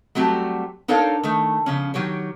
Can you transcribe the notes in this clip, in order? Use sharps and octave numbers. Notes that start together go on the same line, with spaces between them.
F#3 G3 A3 C4 F#4 G4
D4 D#4 A4 A#4 C#5 F5
D#3 A3
C#3 F3 C#4
D#3 F#3 G4 C#5